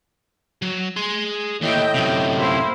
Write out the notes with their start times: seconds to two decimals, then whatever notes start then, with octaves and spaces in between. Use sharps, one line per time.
0.62 F#3
0.96 G#4 C6
1.62 D#2 A2 E3 D#5 E5 G5
1.95 F#2 C3
2.36 A#3 E4 C5